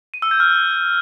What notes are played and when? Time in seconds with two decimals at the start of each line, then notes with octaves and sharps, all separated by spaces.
0.14 D#7
0.22 E6
0.31 G6
0.40 F6